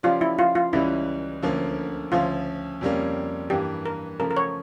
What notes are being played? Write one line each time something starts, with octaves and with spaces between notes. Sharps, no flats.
C#3 F3 C#4 F4 G4 D5
E4
F4
F4
C#2 C#3 E3 G3 C#4 E4
D2 D3 F3 A#3 C#4
D2 C#3 F3 C#4 F4
F2 C#3 G3 A#3 C#4
G2 E3 A#3 G4
A#4
C#3 F3 A3 A#4
A#4
C#5